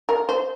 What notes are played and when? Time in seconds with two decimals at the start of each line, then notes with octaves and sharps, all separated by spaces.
0.09 A#4
0.29 C5